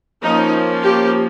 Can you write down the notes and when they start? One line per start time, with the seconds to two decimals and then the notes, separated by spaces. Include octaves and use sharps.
0.23 F3 A#3 C#4 D#4
0.82 G4